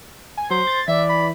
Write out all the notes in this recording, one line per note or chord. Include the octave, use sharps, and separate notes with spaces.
G#5
F#3 C5
A6
E3 D5 E5
B5